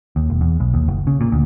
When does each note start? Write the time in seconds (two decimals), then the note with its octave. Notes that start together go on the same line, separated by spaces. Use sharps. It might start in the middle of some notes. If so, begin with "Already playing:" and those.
0.16 D#2
0.30 E1
0.41 E2
0.60 B1
0.74 D#2
0.88 F#1
1.07 C#3
1.21 A#2
1.32 D2